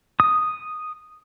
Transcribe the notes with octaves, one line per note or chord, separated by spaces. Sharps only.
D#6